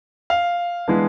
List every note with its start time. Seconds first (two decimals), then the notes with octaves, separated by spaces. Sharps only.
0.30 F5
0.88 E3 G#3 B3 D4